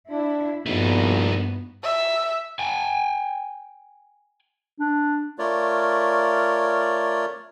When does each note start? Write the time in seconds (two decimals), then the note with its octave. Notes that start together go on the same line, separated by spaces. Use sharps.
0.10 D4 E4
0.66 A#1 G2 A3 B3 D#4 F#4
1.83 E5
2.59 G5 G#5
4.79 D4
5.39 A3 F4 A#4 C#5 D5